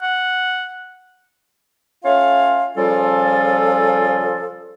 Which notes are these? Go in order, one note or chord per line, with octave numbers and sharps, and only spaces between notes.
F#5
A3 C#4 F4 C#5 F5
C#3 F3 G3 C#4 F4 A4